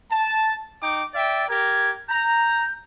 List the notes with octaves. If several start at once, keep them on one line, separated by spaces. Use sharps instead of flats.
A5
D#4 G5 D6
D5 E5 G5 A6
G4 A#4 G#6
A#5 G6